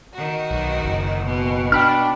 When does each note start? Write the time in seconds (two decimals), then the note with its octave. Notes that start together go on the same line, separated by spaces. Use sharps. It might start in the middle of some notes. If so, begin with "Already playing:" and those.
0.13 D#3 F#4
0.51 B1
0.85 F#1
1.23 B2
1.72 D4 G5 B5 F6